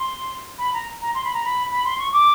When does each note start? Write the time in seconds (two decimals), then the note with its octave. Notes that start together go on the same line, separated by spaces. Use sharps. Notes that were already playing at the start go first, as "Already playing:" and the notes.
Already playing: C6
0.59 B5
0.73 A#5
1.01 A#5
1.15 C6
1.24 B5
1.34 A#5
1.45 B5
1.71 B5
1.85 C6
1.99 C#6
2.13 D6